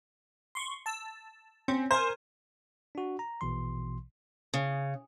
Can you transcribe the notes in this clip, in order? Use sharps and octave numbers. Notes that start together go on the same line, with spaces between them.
C6 C#6
A5 E6
C4 C#4
A#4 C5 G#5
D4 F#4
A#5
A#1 B2 E3 C6
C#3